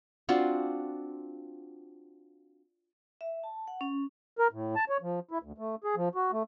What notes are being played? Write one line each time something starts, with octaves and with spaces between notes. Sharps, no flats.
C4 D4 F4 F#4
E5
A5
F#5
C#4
A#4
A2
A5
C#5
F3
E4
D2
A3
G#4
F3
F#4
A3